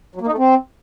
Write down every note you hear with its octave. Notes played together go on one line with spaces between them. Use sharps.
F#3
A#3
D#4
A3
C4